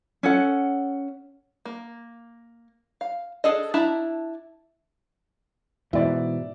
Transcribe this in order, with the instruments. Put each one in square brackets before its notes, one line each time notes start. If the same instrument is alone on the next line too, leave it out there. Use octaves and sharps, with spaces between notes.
[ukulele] C#4 A4 F#5
[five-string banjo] A#3
F5
D4 G#4 A4 D#5
D4 E4 E5 A5 A#5
[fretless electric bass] G#2 B2 E3 [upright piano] D5 E5